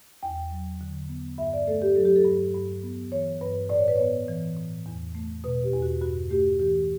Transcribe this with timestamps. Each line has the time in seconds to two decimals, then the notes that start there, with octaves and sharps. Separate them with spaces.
0.23 E2 G5
0.51 F#3
0.81 D3
1.09 B3
1.38 G2 E5
1.53 D5
1.67 A3 A4
1.82 G4
1.96 F#3 A4
2.05 G4
2.16 A4
2.25 G2
2.54 G2
2.83 B3
3.12 E3 C#5
3.41 G2 B4
3.69 A2 D5
3.78 C#5
3.88 B4
3.96 B3 C#5
4.28 E3
4.57 A2
4.86 E2
5.15 A3
5.44 B2 B4
5.64 G4
5.73 E2
5.82 F#4
6.01 G2 F#4
6.30 A3 G4
6.60 E3 G4